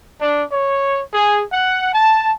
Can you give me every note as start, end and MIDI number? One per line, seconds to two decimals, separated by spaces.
0.20 0.43 62
0.51 1.01 73
1.12 1.42 68
1.51 1.91 78
1.93 2.31 81